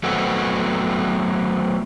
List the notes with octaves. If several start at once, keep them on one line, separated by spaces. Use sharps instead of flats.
F#3 A3 B3 C4 F#4